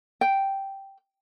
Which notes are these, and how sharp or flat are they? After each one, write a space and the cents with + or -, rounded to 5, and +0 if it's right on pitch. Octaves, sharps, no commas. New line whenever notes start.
G5 -5